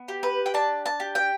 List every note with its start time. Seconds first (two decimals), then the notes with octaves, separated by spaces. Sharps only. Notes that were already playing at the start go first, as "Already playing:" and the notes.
Already playing: B3
0.08 G4
0.23 B4
0.46 G5
0.54 D4 A5
0.86 A5
1.00 G4
1.15 G5